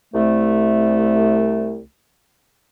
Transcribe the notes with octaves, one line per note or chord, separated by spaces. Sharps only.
C2 A3